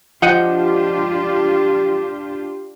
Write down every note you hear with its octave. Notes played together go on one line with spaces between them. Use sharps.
F3 D4 F4 G4 D#5 F#5 G5